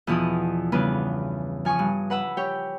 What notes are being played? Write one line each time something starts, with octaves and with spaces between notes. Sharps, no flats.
E2 B2 F3 E4 D#6
G2 C#3 B3 D4 B4
F3 G#5 C#6 D#6
G2
B4 F#5 B5 E6
G4 C#5 G5